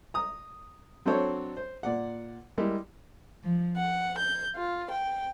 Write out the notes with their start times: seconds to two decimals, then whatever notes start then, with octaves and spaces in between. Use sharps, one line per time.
0.14 A#5 D#6
1.06 F#3 C4 D4 A4 C5 C#5
1.57 C5
1.83 A#2 D5 F#5
2.58 G3 G#3 A#3 E4
3.43 F3
3.76 F#5
4.18 G6
4.57 F4
4.91 G5